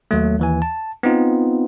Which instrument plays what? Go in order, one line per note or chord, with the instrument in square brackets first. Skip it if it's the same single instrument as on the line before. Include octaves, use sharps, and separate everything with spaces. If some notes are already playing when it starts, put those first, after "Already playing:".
[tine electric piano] D#2 F#3 A3
D#2 E3 G#5
A5
B3 C4 D#4 F4